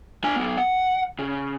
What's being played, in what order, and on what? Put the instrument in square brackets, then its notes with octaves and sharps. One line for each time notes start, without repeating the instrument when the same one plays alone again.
[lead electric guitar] D4 G#5
F#3 B3
F#5
C#3